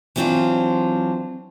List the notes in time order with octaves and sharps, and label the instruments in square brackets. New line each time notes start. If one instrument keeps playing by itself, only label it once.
[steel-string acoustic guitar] E3 F#3 B3 C4 D4 F4